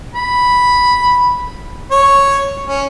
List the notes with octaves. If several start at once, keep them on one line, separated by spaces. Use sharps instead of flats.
B5
C#5
C#4